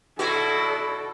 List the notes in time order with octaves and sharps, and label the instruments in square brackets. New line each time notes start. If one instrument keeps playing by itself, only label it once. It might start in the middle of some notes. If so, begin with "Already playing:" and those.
[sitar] B2 F#4 [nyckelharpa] E4 [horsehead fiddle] A4 D5